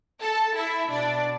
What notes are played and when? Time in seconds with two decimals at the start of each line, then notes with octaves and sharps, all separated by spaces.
0.22 A4 A5
0.56 E4 E5
0.90 B2 D4 D5